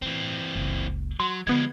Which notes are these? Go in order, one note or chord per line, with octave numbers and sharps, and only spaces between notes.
A2 E3 C4
F#1 C#2
F#3 C6
D3 F3 G#3 B3 F4 G#6